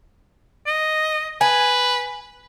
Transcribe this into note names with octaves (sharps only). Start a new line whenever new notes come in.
D#5
B4 G#5